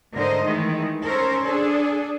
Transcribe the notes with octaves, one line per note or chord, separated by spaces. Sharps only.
G#2 D3 A#4 C5 D#5
D#3 E3 G#3 A3
C#4 A4 A#4 C5 C#5
D4 G#4 A4